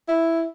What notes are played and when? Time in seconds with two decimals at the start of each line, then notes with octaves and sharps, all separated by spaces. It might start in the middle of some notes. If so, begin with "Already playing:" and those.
0.08 E4